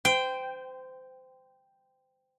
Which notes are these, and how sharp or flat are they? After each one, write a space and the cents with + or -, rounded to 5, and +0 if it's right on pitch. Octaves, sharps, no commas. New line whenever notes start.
C5 -25 G5 +0